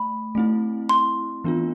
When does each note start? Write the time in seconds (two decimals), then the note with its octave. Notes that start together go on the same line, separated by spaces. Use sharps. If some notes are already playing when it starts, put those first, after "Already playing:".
Already playing: A3 B5
0.35 A3 C4 E4
0.89 C6
1.44 E3 B3 D4 F4